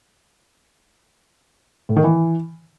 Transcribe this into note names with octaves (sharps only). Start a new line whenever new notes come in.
A2
D#3
E3